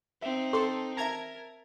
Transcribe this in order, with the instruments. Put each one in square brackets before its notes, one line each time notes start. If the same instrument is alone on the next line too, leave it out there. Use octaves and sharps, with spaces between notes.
[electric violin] C4 D#4 [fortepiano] E5
[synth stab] A4 [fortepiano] C6
[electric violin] A#4 [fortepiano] E5 A5 [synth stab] A#5 G#6